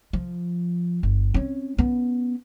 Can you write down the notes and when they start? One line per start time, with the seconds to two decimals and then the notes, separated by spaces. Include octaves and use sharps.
0.13 F3
1.03 G1
1.34 C4 C#4
1.78 B3 C#4